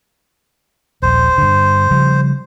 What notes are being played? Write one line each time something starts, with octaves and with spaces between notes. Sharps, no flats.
D#1 A#1 C5
G2 D3
C#3 F3 G3